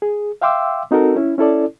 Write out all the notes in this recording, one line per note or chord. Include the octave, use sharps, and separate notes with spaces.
G#4
E5 F5 G5 C6 D6 E6
C4 D#4 F#4 A4 A#4
C#4 E4
C#4 E4 A4 D5